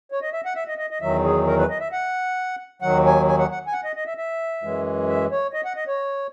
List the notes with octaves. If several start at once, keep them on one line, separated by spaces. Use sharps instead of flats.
C#5
D#5
E5
F#5
E5
D#5
D#5
D#5
E2 D#3 F#3 E5
G#4
A#4
B4
D#5
E5
F#5
D#2 D#3 F#3 F#5
G#5
G#5
F#5
F#5
G#5
F#5
D#5
D#5
E5
E5
F#2 E3 G#3
E5
C#5
D#5
F#5
D#5
C#5